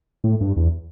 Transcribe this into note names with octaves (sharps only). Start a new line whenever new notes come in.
A2
G2
E2